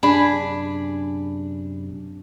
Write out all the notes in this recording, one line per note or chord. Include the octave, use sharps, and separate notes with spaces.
F#2 C3 D4 G#4 G#5 B5